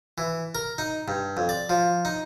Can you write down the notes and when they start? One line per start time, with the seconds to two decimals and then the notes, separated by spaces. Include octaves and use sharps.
0.18 E3
0.55 A#4
0.78 D#4
1.08 G2
1.37 F2
1.49 D5
1.69 F3
2.05 D#4